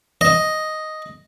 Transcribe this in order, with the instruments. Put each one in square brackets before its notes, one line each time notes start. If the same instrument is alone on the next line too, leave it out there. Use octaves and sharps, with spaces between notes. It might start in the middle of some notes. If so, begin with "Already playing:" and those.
[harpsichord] D#5